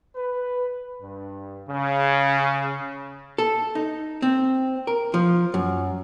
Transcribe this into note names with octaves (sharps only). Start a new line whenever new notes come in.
B4
G2
C#3
A4
D#4
C4
A#4
F3
F#2